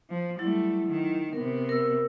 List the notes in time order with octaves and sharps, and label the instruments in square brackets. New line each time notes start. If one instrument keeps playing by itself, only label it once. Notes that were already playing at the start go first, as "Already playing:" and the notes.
[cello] F3
[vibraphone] F#3 E4 [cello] G3 A3
[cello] D#3
[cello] C3 B3 [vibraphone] A#4
[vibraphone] A#4 E6